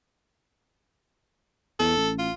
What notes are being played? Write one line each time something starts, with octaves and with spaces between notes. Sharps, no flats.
E2 A4
A1
F4